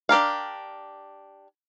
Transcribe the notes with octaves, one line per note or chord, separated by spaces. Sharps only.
D4 G4 A#4 F5